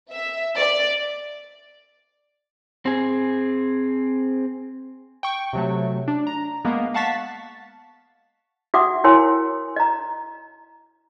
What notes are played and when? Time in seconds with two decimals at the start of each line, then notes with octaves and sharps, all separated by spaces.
0.11 E5
0.57 D5
2.86 C4 G#4
5.23 G5 C#6
5.53 C3 F#3 A3
6.08 D4
6.27 A#5
6.65 G#3 A#3 B3
6.94 F5 F#5 A5 C#6 A6 B6
8.74 F#4 E5 F#5 D6 D#6
9.04 E4 A#4 C#5 G#5 C6
9.76 D#5 A#5